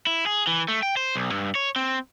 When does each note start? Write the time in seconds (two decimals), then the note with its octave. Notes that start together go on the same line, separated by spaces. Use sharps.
0.07 E4
0.26 G#4
0.47 E3
0.68 A3
0.83 G5
0.97 C5
1.16 B1
1.32 G2
1.55 C#5
1.76 C4